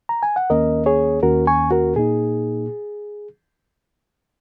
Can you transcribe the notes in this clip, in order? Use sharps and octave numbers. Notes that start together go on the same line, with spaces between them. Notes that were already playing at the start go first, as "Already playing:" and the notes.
A#5
G#5
F#5
D#2 D#3 A#3 C#4 A#4 D#5
G#4 C#5
D#2 D#3 A#3 C#4 F#4 A#4
G#5 C#6
F#4 A#4
A#2 A#3 D#4 G#4